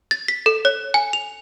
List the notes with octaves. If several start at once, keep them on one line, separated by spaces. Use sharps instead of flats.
A6
B6
A4
C#5
G#5
F7